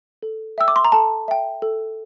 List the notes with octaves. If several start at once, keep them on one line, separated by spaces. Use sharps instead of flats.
A4
E5 G5 E6
D6
C6
A#5
A4 A5
E5 G5
A4